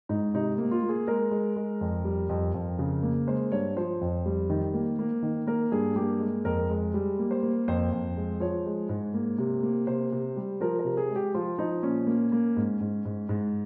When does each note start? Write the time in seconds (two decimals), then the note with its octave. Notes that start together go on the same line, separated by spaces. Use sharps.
0.09 G#2 D#4
0.34 C3 D#4
0.58 A#3
0.71 F4
0.83 A#3
0.89 G#4
1.07 G#3 A#4
1.31 G#3
1.56 G#3
1.81 F2
2.05 G3
2.29 F2
2.54 F2
2.79 C#3
3.03 A#3
3.27 G#3 C5
3.52 G2 C#5
3.77 F3 C5
4.01 F2
4.26 G3
4.50 D#3
4.74 A#3
4.99 A#3
5.23 D#3
5.47 A#3 A#4
5.72 G2 G#4
5.96 A#3 G4
6.20 G#3
6.45 F2 A#4
6.70 G#3
6.94 G3
7.19 A#3
7.31 C5
7.43 A#3
7.68 F2 C5
7.92 F2
8.17 G#3
8.40 F3 C#5
8.66 G#3
8.89 G#2
9.14 A#3
9.38 C3
9.63 A#3
9.87 C3 C5
10.12 C3
10.36 G3
10.61 F3 A#4
10.79 A#4
10.85 C3
10.97 G#4
11.10 G#3
11.15 G4
11.34 F3 F4
11.58 F3 D#4
11.83 A#2 C#4
12.07 A#3
12.32 A#3
12.57 G#2
12.80 G#2
13.05 G#2
13.29 G#2